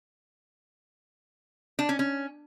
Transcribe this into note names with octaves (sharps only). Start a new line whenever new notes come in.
D4
C#4
C#4